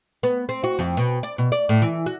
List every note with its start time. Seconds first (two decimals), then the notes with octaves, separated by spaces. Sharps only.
0.23 B3
0.49 C4
0.64 F#4
0.79 F2
0.97 B2
1.23 D5
1.38 B2
1.52 D5
1.69 A2
1.82 E3
2.06 F#4